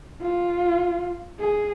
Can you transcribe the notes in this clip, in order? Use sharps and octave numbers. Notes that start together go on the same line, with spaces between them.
F4
G#4